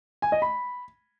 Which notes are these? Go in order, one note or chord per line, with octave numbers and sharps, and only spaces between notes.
G#5
D#5
B5